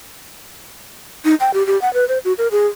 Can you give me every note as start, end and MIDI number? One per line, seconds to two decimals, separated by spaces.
1.25 1.35 63
1.40 1.53 79
1.54 1.65 67
1.67 1.80 67
1.82 1.92 78
1.94 2.07 71
2.08 2.18 72
2.25 2.33 66
2.38 2.48 70
2.51 2.67 68